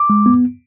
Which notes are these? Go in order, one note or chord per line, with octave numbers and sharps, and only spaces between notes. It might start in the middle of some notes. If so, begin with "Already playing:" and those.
Already playing: D6
G#3
B3